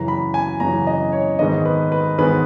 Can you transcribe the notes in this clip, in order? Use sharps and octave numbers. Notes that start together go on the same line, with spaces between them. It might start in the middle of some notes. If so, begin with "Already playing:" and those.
Already playing: F#2 C#3 E3 A#5
B5
G#5
F#2 C#3 E3 A#5
D#5
C#5
G#2 D#3 G#3 B3 D#5
B4
B4
G#2 D#3 G#3 B3 B4